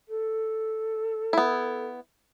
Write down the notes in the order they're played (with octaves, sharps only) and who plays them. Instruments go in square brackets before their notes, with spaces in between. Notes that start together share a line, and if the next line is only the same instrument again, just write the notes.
[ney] A4
[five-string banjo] B3 E4